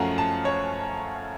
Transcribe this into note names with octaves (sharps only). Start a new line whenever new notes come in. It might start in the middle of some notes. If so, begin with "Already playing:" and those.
Already playing: F#2 F3 A3 C#4 F5 F#5 A#5
A5
C#5